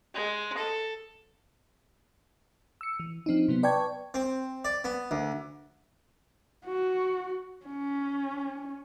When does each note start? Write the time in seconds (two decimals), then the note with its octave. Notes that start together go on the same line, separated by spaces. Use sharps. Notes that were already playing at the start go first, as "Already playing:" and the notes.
0.14 G#3
0.58 A4
2.81 E6 C#7
3.00 E3
3.26 F3 C4 D4 D#4
3.48 C3 F#3 B3
3.63 B4 D5 G5 A5 C#6 G#6
4.14 C4
4.65 D5
4.84 B3
5.11 D2
6.65 F#4
7.66 C#4